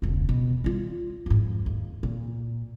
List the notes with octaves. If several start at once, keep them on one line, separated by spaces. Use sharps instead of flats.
E1 C#2
B2
G3 F4
F2 G#2
D#2
A#2